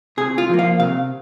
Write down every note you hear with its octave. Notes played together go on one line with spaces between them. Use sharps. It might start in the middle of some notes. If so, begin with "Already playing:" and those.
C3 G#4
F4
F3 A#3
F5
C3 F5